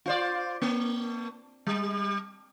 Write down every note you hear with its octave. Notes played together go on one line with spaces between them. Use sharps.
F4 C5 D5
A#3
G3